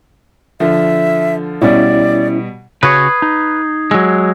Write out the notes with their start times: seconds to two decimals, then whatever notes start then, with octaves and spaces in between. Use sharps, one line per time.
0.60 D3 F3 E5
1.62 B2 G3 C#4 E4 D5
2.83 C#3 F#4 B4 C#5 D#6 G#6 C7
3.22 D#4
3.91 F#3 G#3 E6